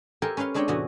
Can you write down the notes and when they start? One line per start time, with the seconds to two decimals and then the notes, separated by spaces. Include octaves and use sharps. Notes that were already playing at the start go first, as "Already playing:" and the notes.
0.22 G4 A4 A#4 C5 G5 G#5
0.37 C#4 B4 C#5 F5 C6
0.54 G#3 C4 D4 C#5 D#5 G5
0.68 E2 A2 C3 E3 F#4 D#5